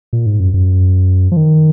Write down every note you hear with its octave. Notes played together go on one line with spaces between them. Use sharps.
A#2
G#2
F#2
F#2
F3
D#3